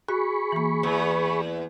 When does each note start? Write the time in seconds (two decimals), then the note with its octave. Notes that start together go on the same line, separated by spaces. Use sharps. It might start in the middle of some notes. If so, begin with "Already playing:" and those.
0.08 F#4 G#4 B5 C#6
0.52 E3 A#3
0.83 E2